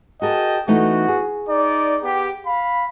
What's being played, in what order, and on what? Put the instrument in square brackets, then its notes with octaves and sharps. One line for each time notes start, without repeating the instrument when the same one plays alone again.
[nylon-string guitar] F#4 G#4 A#4 [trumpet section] D#5 G5 A5
[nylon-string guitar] E3 A3 D#4 [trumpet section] B3 F#4
[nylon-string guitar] G#4
[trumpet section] D#4 D5
B3 G4
F5 B5